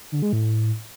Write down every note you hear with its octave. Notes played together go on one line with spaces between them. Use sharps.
D3
G#3
A2